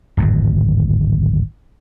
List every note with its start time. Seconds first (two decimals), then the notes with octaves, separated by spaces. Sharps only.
0.17 D1 G#1 F2